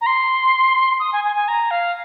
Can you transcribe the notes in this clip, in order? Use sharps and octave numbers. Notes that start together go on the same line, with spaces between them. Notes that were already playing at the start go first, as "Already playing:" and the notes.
A#5
C6
D#6
G#5
G#5
G#5
A#5
F5